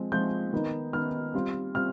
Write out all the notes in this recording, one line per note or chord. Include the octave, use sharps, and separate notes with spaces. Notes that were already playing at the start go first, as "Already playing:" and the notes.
Already playing: F3 G#3 C4
F3 G#3 C4 F4 G6
D#3 B3 D#4
D#3 B3 D#4 F6
G3 C4 F4
G3 C4 F4 F6